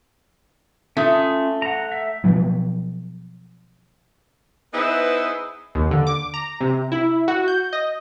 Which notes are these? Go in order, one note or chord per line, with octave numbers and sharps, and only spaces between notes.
A3 C#4 F4 D#6
F#5 A#5
E5
B2 F3 F#3
B3 D#4 E4 G#4 B4 C5
D#2
D3
D6
A#5
C3
E4
F#4
G6
D#5